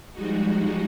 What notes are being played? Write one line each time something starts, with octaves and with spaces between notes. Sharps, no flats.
F3 G3 G#3 D#4 F#4